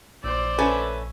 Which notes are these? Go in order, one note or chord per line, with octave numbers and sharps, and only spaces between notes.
A#1 C5 D5 E6
A3 C#4 B4